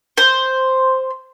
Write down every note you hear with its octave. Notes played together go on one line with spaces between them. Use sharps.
C5